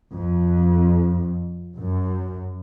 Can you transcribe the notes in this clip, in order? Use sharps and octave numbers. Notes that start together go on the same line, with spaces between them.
F2
F#2